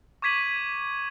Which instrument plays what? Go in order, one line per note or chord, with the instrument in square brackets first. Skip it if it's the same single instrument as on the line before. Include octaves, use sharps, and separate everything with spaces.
[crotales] C#6 D6 G#6 B6 D#7 F#7